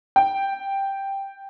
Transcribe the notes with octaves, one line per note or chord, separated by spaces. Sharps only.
G5